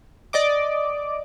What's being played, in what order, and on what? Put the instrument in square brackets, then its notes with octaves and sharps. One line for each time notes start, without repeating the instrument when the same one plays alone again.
[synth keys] D5 D#5 D6